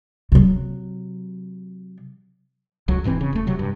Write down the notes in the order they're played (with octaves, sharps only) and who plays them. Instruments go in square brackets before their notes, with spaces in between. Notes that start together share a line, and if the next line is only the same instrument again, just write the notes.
[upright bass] C3 F#3
[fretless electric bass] D1 C#2 F#3
D#1 G#2 E3 C4
C#3
D#1 A3
C3 F#3
G2